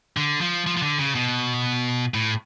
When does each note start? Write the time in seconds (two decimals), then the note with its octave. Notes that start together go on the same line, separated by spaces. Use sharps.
0.17 D3
0.41 F3
0.66 F3
0.77 F3
0.82 D3
0.99 C#3
1.15 B2
2.14 A2